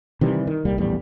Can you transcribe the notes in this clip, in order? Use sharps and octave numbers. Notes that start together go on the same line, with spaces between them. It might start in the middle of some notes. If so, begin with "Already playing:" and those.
C3 D#3 E3 G3
D#3
D#1 C2 G3 A#3
A#1 E2 A2 G3